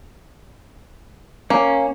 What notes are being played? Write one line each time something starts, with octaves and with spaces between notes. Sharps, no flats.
A#3 C#4